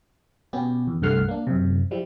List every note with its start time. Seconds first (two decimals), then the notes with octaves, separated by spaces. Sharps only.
0.53 B2 B3 C#4 G4
0.87 E2
1.02 C2 G2 A3 F#5 F6 C7
1.28 A#3 D4
1.47 F#2 C3
1.91 F3 G3 E4